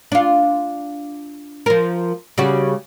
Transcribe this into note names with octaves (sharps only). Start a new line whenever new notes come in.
D4 F4
F3 A#4
C#3 G3 F#4